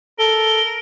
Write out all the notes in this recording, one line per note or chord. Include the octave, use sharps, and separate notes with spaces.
A4 A#4 G7